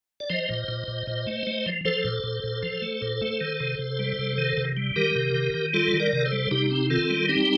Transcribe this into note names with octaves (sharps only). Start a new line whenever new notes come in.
D5
F3 C5 D#5
A#2
A#2
A#2
A#2
A3
A3
F3
F3 A4 C5
A#2
A#2
A#2
F3
A3
A#2
A3
D#3
C3
C3
G3
C3
D#3
C3
G3
D#3 G4 A#4
C3
D#3
D#3
G3 F4 A4
D#3
A#4 D5
C3
A4 C5
G3
C3 D#4 G4
C4
D#3 F4 A4
G3
C4 D#4 G4